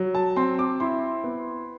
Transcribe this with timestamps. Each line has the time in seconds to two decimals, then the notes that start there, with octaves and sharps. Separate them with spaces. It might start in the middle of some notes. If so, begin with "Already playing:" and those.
Already playing: F#3
0.15 A5
0.36 C4 C6
0.59 D6
0.80 E4 C6
1.24 B3